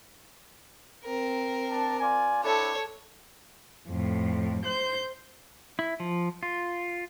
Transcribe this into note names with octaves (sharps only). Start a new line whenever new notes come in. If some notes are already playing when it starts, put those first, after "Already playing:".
C4 A#4
D4 A5
F4 D5 G#5
C4 D4 E4 A4 C#5
F2 A2
C5 G6
E4
F3
F4